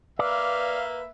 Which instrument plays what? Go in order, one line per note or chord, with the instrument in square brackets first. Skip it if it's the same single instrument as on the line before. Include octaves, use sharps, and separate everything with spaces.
[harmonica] A#3 E5 [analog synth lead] B4 [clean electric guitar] D5 [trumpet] F5